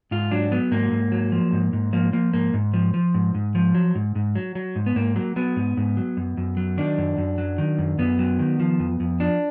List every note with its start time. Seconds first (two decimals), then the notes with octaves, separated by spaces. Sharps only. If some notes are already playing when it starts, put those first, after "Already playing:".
0.11 G#2 F4
0.31 F#3 D4
0.52 F#3 B3
0.71 G#2 A#3
0.92 G#2
1.12 F#3
1.32 F3
1.53 G#2
1.73 G#2
1.93 F3 A#3
2.13 F3 A#3
2.33 G#2 A#3
2.54 G#2
2.73 F3
2.94 F3
3.14 G#2
3.35 G#2
3.55 F3
3.75 F#3
3.95 G#2
4.15 G#2
4.35 F#3
4.55 F#3
4.76 G#2
4.86 B3
4.96 G#2 A#3
5.16 F#3 A#3
5.36 F#3 B3
5.56 G#2
5.77 G#2
5.97 F#3
6.17 F#2
6.37 F#2
6.57 F#3
6.77 D#3 D4
6.98 F#2
7.18 F#2
7.38 F#3
7.58 D#3
7.78 F#2
7.98 F#2 B3
8.19 F#3
8.39 D#3
8.60 F3
8.79 F2
9.00 F2
9.20 F3 D4